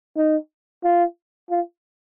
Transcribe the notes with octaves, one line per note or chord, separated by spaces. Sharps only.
D#4
F4
F4